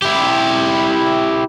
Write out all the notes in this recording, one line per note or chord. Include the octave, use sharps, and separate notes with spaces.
E4 G4